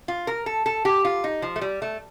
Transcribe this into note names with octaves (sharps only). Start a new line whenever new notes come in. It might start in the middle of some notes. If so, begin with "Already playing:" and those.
F4
A#4
A4
A4
G4
F4
D#4
F3
A3
G3
A3